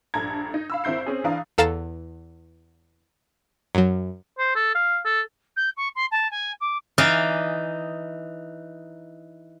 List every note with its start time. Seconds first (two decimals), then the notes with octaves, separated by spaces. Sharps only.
0.14 A#1 G2 A4 A#5 G#6
0.54 D#4
0.70 F5 B5 E6
0.84 G#1 C4 E4 G6 C7
1.06 C4 C#4 G#4
1.24 E3 D4 F5 A#5 D#6
1.58 E2 A4 F5 A#5 A6 E7
3.75 F#2 F#3
4.39 C5
4.56 A4
4.75 F5
5.06 A4
5.56 G6
5.76 C#6
5.95 C6
6.11 A5
6.30 G#5
6.60 D6
6.98 E3 D#4 D5 F5 G#5